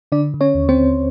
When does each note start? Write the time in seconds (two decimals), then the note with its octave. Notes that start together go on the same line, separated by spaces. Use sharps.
0.12 D3 D4 D5
0.34 D3
0.41 C#4 C#5
0.55 D#2
0.69 C4 C5
0.76 D#2